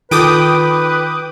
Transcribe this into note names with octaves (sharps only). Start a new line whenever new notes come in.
D#3 D#4 F4 A4 B4 G5 D6 D#6